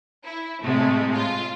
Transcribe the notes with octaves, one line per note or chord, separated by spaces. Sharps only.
E4
A2 C3 G#3 A3
F4